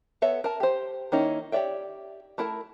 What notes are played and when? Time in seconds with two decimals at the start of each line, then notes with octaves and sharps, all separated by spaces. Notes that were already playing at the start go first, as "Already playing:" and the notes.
0.22 B3 A4 C#5 E5
0.44 A#4 A5
0.60 G4 C5
1.12 D#3 A#3 C#4 D#4 E4
1.52 G4 C#5 D5 E5 G5
2.38 A3 E4 A#4 A5